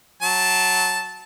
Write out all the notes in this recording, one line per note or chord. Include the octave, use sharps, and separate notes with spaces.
F#3 A5